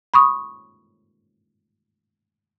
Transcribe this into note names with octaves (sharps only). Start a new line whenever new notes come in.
B5 C#6 D#6